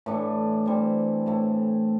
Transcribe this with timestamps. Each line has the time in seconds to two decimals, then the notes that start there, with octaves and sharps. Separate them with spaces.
0.06 A2 E3 A3 D4
0.66 E3 G3 C4
1.26 A2 E3 A3